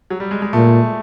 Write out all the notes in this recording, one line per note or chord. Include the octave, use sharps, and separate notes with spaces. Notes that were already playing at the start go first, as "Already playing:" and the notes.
F#3
G3
G#3
G#3
A#2 A3